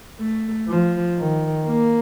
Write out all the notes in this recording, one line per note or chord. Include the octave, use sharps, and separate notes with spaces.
A3
F3
D#3
A#3